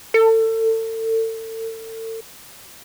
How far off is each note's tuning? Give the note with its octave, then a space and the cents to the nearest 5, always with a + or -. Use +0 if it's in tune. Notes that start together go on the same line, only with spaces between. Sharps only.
A4 +35